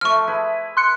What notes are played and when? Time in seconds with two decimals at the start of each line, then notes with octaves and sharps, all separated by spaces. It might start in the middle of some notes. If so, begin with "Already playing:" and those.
0.01 F3 A3 C#6 F6
0.28 E4 G#4 B4
0.77 C6 F#6 C#7